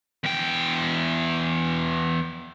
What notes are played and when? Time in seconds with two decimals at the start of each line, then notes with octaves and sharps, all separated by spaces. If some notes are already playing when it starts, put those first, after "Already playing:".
0.24 E2 G5